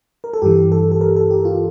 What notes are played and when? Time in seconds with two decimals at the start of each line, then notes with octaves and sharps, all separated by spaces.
0.24 A#4
0.33 A4
0.42 G2 E3 G4
0.72 A4
0.92 A4
1.01 A#4
1.16 A4
1.30 G4
1.45 F4